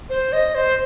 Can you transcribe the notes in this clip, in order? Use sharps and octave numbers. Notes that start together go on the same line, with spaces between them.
C5
D#5
C5